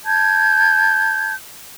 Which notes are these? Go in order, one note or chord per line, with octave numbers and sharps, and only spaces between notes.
A5 G6 G#6